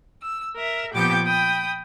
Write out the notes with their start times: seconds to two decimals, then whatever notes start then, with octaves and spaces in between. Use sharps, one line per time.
0.22 E6
0.55 A#4 E5
0.94 A#2 F3 B3 G4 G5 D6
1.24 G5 B5 D#6